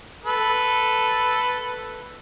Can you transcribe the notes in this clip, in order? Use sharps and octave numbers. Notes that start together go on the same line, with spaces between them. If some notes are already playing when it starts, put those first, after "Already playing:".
A4 B4